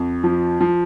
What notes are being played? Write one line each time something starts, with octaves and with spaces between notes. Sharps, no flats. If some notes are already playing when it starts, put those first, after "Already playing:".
Already playing: F2
F3
F3